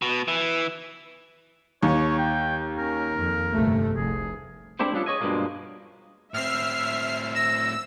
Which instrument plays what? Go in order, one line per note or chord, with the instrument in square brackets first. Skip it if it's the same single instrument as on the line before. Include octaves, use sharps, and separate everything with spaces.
[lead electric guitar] B2
E3
[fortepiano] D#2 [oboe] C#5
[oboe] G5
[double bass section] C#4 [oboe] A#4
[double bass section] F2
G1 C3 A3
[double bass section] F1 C2 [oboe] G#4
[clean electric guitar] A3 C4 D4 E4 G4 C5
G3 B3 C#4 D4 F4 A4
G#4 C#5 D#5 G#5
G2 B2 F3 G#3 A#3
[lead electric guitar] A2 C4 [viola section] E5 [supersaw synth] F6 C7
[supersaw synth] E6 [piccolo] A#6